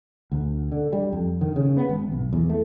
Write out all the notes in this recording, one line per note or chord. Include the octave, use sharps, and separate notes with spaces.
D2
D3
G3
F2
D#3
C#3
B3
G#1
B1
E2
A3